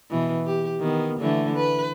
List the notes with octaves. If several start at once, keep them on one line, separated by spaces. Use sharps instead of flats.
B2 E3
G4
D#3 B3
D3 E3 A3
B4